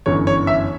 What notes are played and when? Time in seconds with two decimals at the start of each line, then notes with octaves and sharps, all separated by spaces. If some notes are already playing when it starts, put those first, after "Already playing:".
0.06 G1 F#2 E3 C#5
0.27 C#5
0.47 E5